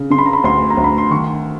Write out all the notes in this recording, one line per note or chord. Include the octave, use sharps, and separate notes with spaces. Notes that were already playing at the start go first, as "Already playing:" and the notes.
Already playing: C#3
C#3 C6
B5
A#5
B5
D2 C6
A#5
D2
B5
C6
D#3 C#6